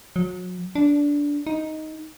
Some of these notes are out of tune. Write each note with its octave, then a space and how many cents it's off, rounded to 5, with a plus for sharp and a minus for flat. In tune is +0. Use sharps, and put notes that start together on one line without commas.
F#3 -35
D4 -15
D#4 +5